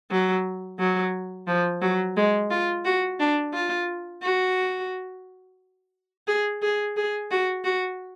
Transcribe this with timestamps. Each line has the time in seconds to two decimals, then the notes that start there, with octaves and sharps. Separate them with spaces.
0.11 F#3
0.79 F#3
1.47 F3
1.82 F#3
2.17 G#3
2.51 F4
2.85 F#4
3.19 D4
3.54 F4
4.23 F#4
6.28 G#4
6.62 G#4
6.97 G#4
7.31 F#4
7.64 F#4